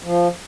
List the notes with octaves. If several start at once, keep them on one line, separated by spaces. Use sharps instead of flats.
F3